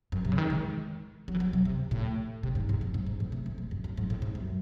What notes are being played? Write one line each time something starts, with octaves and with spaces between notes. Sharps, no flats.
F#2
C3
C#3
D#3
G#3
F#3
E3
F#3
C3
C3
A2
C3
G#2
G#2
F#2
G#2
G#2
A2
C3
A2
G#2
F#2
F#2
G#2
A2
G#2
F#2